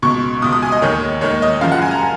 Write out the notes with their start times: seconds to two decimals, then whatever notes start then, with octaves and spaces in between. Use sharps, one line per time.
0.02 C#2 B2 C#6
0.42 C#2 B2 D#6
0.52 D#6
0.62 G#5
0.72 D#5
0.82 D#2 D#3 C#5
1.21 D#2 D#3 C#5
1.42 D#5
1.61 F#2 C#3 F3 F5
1.72 F#5
1.82 G#5
1.91 A#5